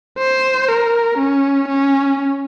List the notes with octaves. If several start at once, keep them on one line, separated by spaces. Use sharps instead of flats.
C5
A#4
C#4
C#4